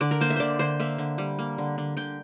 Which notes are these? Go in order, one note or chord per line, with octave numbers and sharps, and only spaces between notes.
D3 D5
A#4
A#3 C5
E5
D3 C5 D5
D3 C5
A#3 E5
D3
G3
A#3
D3
D3
D3 G5